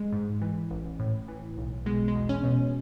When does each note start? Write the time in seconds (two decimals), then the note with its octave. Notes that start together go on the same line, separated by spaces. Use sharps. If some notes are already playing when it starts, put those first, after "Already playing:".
Already playing: G#3
0.12 G#2
0.42 E3
0.71 A1
0.99 A2
1.28 E3
1.57 B1
1.86 B2 G#3
2.08 G#3
2.15 E2
2.29 C#4
2.44 B2